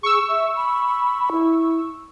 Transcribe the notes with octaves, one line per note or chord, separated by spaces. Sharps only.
G#4 C#6 E6
E5
B5
E4